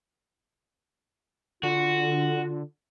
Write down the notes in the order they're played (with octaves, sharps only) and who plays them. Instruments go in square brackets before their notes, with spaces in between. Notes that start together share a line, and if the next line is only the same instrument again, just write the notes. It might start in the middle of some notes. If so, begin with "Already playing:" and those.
[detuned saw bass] D3 [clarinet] F4 [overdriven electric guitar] F#4